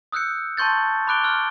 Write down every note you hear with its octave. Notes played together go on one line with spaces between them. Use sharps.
D#6 E6 F#6 G6 C#7
A5 C6 C#6 G6 A6
B5 D6 F#6 D7 G7
C6 F6 F#6